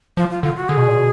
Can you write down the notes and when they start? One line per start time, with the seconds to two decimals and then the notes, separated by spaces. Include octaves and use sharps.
0.17 F3 F4
0.30 F4
0.43 D3 F4
0.56 F#4
0.69 D3 G#4
0.77 B2
0.88 A#2
0.96 B2